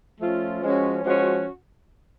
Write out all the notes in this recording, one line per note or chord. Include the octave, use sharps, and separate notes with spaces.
F3 A3 C#4 F4
F3 G#3 C#4 F#4
F3 G#3 C#4 F#4